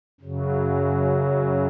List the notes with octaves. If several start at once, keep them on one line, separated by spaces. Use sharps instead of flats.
F#2 C#3 F#3